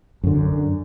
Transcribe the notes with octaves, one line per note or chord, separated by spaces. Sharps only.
F#2 D3